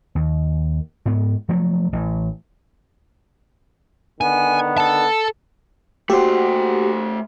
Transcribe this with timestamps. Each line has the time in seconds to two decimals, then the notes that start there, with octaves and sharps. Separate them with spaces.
0.15 D#2
1.06 G#2 B3
1.49 F3 F#3 A3
1.93 A1
4.21 D3 D#3 B3 G#5
4.78 A4 A5
6.10 A3 A#3 F#4 G4 C5 F#5